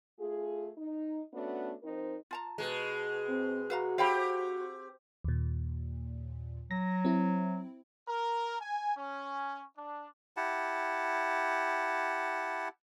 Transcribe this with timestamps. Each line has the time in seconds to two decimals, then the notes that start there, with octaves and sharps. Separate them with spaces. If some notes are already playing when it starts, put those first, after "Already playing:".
0.19 A3 F4 G#4
0.78 D#4
1.33 A3 B3 C#4 D4 F#4
1.83 F3 C4 D#4 A#4 C5
2.31 F4 A5 A#5
2.58 B2 G#3
3.28 C4
3.70 F#4 B4 F5 A#5
3.98 C4 G4 F5 G5 B5
5.24 D#2 A#2
6.71 F#3 A#6
7.05 C4 E4
8.08 A#4
8.58 G#5
8.95 C#4
9.77 D4
10.37 E4 G4 F#5 A5